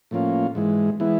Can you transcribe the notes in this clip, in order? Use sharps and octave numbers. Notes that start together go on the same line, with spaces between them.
A2 F3 A#3 C#4 F4
G#2 E3 G#3
E3 G#3 B3 E4